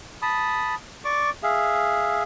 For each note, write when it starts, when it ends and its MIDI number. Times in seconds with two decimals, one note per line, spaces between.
0.22 0.75 81
0.22 0.75 83
0.22 0.75 87
1.05 1.30 74
1.05 1.30 85
1.05 1.30 86
1.43 2.23 68
1.43 2.23 76
1.43 2.23 77